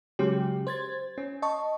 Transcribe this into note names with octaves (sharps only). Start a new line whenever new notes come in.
C#3 F#3 G#3 C#4 G4
C5 G#6 A6
C#4
D#5 A5 C#6